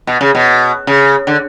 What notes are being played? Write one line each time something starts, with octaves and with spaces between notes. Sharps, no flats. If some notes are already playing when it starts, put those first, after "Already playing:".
B2
C#3
B2
C#3
D3